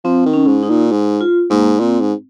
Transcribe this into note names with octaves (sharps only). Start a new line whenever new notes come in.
F3 C4
D#3
C#4
G#2
D#4
A#2
G#2
F4
G#2 A#3
A#2 C4
G#2